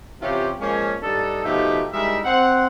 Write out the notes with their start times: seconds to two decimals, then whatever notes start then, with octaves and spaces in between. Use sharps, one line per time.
0.21 C3 E3 C#4 F4 G4
0.60 F3 G#3 A#3 C#4
1.02 G2 D4 D#4 A4
1.44 B2 F3 A3 D#4 G4
1.93 G3 G#3 D#4 E4 A#4 E5
2.25 C4 F#5